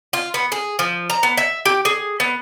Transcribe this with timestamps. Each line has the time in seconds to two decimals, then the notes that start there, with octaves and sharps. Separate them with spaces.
0.13 F4
0.34 B3
0.52 G#4
0.79 F3
1.10 A#5
1.23 B3
1.37 E5
1.66 G4
1.85 G#4
2.20 B3